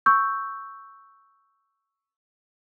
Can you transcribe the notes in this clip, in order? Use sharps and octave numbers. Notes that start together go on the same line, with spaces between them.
C#6 E6 G6